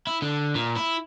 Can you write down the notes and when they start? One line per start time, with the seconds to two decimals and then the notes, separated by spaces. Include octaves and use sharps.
0.07 E4
0.22 D3
0.55 A#2
0.76 E4